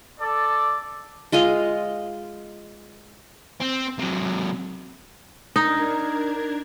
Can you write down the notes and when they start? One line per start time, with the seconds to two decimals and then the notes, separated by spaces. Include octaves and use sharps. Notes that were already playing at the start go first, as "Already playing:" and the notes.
0.20 A4 D5
1.32 G#3 F4 D#5 F5
3.60 C4
3.99 C3 F#3
5.56 D4 D#4 A#4 G#6